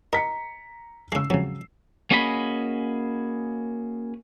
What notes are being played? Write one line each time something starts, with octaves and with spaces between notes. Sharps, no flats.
A#4 D#5 A#5 B6 C#7
C#3 G#3 E6 C7
F2 G#2 C#3 F#3
A#3 C#4 F#4 G#4 D#5 B5